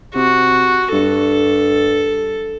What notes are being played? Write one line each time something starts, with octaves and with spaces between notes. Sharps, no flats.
C3 F#4
G2 A4